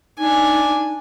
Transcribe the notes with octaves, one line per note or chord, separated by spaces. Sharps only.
D4 D#4 G#5